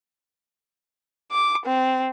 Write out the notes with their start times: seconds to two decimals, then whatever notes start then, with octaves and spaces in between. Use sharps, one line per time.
1.31 D6
1.66 C4